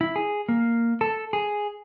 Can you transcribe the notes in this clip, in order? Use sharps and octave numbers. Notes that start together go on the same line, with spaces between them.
E4
G#4
A#3
A4
G#4